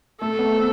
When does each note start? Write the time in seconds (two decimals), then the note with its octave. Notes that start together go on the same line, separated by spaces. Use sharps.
0.20 A3 A4
0.39 B3
0.57 C4